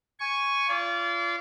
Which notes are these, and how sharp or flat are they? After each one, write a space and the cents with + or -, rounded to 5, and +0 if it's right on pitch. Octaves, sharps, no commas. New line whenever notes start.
G#5 +0 C#6 +0
F4 -25 D5 -35